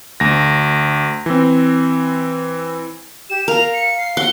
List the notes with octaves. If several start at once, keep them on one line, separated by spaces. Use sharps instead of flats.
D2 A#6
E3 C4
G4 E7
A#4 F5 F7
C#7
C7
F#5 G7